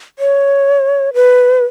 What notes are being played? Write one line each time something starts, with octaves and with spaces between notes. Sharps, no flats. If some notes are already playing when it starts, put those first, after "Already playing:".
C#5
B4